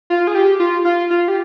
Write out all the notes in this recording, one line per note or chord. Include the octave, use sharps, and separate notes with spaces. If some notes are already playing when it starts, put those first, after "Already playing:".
F4
G#4
G4
F4
F4
F4
G4